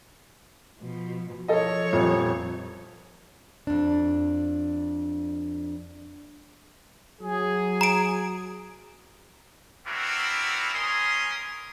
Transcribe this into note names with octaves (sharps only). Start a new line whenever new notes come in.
B2 F3
F3 A4 C#5 D#5
D#1 F2
F2 D4
F#3 G#4
A#5 D7
B3 C4 D4 E4 F#4 A#4
B3 C#4 A#4 G#5 C6 D#6